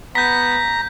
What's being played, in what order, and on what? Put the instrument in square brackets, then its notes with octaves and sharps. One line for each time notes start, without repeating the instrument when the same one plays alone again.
[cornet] B3 [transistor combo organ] A#5 [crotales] G6 B6